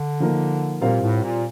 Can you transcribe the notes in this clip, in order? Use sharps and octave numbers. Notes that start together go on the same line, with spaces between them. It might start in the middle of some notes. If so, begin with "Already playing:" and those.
Already playing: D3
F3 A#3 D#4
A#2 G3 C4 F4 A#4 F5
A2
A#2